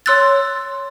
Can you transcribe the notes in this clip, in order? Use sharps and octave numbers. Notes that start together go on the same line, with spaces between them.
C#5 C6 E6 F#6 A6